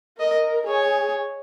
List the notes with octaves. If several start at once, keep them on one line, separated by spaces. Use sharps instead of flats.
A#4 D#5
G#4 C#5